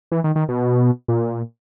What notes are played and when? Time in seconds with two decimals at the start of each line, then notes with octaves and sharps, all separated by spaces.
0.12 E3
0.24 D#3
0.36 D#3
0.49 B2
1.08 A#2